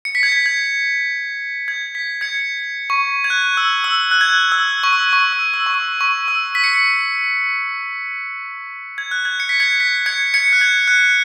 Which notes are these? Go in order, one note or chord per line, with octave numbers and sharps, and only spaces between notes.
C#7
B6
G#6
B6
G#6
G#6
B6
G#6 C#7
C#6
G#6
F#6
E6
E6
F#6
G#6
F#6
E6
C#6
E6
C#6
E6
E6
C#6
E6
C#6
E6
B6
C#7
B6
G#6
F#6
G#6
C#7
B6
G#6 C#7
B6
G#6 C#7
G#6 C#7
F#6
G#6
F#6